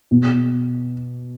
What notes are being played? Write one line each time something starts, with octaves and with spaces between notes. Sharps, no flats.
B2